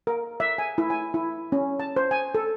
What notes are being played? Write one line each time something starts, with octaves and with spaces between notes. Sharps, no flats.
A#4
E5
G#5
E4
G#5
E4
C#4
A5
C5
G#5
A4